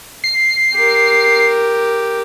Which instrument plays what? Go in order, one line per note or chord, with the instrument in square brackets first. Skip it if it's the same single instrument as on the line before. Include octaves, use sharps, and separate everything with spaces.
[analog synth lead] C7
[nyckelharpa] G4 A#4